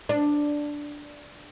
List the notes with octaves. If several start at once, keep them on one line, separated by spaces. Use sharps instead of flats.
D4